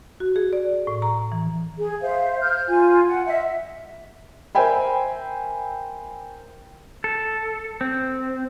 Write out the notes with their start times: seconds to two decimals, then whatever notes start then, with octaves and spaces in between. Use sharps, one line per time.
0.20 F#4
0.36 G#4
0.53 D5
0.87 A2
1.02 A#5
1.32 E3
1.78 G#4
2.02 C5 E5 F5
2.40 F6 G6
2.68 F4 G#5
3.07 F#5
3.26 D#5 E5
4.55 A#4 C5 E5 G5 G#5 B5
7.04 A4
7.81 C4